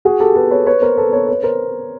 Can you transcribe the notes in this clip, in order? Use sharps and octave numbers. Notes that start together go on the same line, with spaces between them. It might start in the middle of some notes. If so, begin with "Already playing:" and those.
F#4 G#4
G4 A4
A4 B4
B4 C#5
B4 C#5
A#4 C5
A4 B4
B4 C#5
B4 C#5
A#4 C5